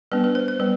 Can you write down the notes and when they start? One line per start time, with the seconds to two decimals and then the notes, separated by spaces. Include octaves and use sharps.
0.12 G3 B3 D4 B4
0.24 B4
0.35 C5
0.48 C5
0.60 G3 B3 B4